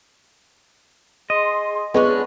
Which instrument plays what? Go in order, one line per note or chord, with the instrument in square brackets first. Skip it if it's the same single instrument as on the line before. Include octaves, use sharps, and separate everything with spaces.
[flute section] G#4 C6 [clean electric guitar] D#5
[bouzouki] G#3 C#4 D4 [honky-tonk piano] B3 [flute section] F4